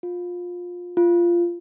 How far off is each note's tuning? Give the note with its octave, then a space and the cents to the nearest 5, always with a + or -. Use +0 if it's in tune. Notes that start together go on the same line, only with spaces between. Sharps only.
F4 +20
F4 -15